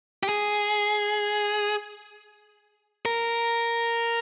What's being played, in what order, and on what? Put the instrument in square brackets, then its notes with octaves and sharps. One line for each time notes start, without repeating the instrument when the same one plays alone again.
[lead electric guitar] G4
G#4
A#4